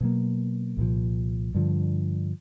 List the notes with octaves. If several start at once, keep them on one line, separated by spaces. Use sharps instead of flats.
B2 F#3 A#3
C2 A#2 F3
G2 D3 F3